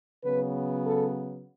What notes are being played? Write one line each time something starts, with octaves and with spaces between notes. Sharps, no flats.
C#3 F#3 B3 B4
A4